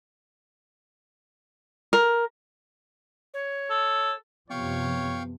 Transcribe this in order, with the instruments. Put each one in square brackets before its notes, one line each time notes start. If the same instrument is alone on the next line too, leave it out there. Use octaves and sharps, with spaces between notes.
[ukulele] A#4
[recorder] C#5
[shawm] A4
[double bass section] F#2 C3 F3 [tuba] B3 [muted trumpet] C#5 [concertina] F5 G5 C#6